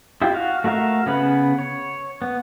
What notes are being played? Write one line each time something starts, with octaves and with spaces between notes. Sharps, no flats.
E4 F4 G4
F#4 F5
A3 F#4 A#4 E5 F5
C#3 B3 G#4 B4 B5
C#5
B3